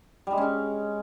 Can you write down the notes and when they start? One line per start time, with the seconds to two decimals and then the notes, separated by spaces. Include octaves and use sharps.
0.27 G3
0.32 G#3
0.38 C#4